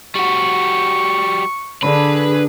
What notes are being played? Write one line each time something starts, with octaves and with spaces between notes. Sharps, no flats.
G3 F#4 C#6
D3 D4 G#4 B4